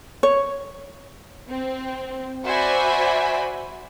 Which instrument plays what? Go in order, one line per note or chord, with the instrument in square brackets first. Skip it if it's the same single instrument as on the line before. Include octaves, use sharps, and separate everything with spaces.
[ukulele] C#5
[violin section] C4
F#4 C5 D5 E5 G#5 B5